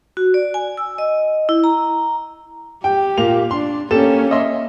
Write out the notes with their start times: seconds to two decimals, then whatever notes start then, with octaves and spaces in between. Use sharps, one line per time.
0.17 F#4
0.34 D5
0.54 G#5
0.77 E6
0.98 D#5
1.49 E4
1.64 A#5
2.84 G4 G5
3.18 A#2 A#3 F7
3.51 D4 C6
3.91 A#3 C#4 G4 A4 E7
4.31 D#5 E5 C6